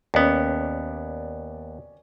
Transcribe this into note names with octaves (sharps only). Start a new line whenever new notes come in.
D#2 B3 C#4 D5